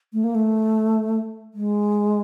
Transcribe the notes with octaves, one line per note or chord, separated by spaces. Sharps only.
A3
A#3
A3
G#3